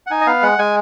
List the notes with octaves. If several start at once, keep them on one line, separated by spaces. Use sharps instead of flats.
F#5
D#4 G#5
D#5
B3 F5
G#3 F#5
G#3 G#5